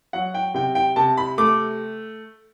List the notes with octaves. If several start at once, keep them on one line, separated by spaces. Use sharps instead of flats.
F#3 F#5
G5
C3 G5
G5
C3 A5
B5
A3 D6